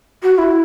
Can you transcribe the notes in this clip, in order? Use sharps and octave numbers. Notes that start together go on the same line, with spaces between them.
F#4
F#4
E4